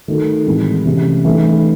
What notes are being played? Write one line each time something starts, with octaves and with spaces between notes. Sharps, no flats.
D#3 A3 D#4 F#4 A4
A2 E3 G#3 C4 E4
C3 E3 A3 C#4
E3 A3 D#4